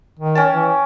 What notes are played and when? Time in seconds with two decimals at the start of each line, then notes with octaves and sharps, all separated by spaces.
0.19 D#3
0.35 C#4 G5 A5
0.51 E3